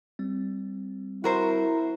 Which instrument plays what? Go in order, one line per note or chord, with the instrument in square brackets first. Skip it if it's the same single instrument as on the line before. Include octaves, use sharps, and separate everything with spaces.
[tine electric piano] G3 C4
[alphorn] E4 [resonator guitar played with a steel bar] F#4 A#4 C5